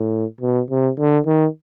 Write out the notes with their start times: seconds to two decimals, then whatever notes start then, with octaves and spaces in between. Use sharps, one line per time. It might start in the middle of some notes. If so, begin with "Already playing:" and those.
Already playing: A2
0.41 B2
0.71 C3
0.99 D3
1.27 D#3